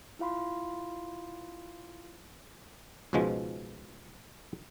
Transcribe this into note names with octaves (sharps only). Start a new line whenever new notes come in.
E4 F4 F5 B5 C6
C#2 G#2 B2 F3 G#3